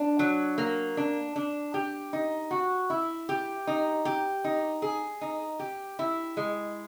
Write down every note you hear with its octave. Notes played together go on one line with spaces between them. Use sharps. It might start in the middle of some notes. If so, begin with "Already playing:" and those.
Already playing: D4
F#3
A#3
D4
D4
G4
D#4
F#4
E4
G4
D#4
G4
D#4
G#4
D#4
G4
E4
G#3